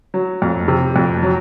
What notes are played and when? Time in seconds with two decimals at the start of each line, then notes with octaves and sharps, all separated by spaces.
0.14 F#3
0.42 F2
0.68 C3
0.96 F2
1.23 F#3